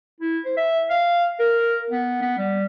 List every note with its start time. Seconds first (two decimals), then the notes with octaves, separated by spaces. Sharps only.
0.21 E4
0.45 C5
0.57 E5
0.90 F5
1.39 A#4
1.91 B3
2.22 B3
2.39 G3